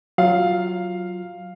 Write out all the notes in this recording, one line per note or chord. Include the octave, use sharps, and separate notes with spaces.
F#3 F4 F5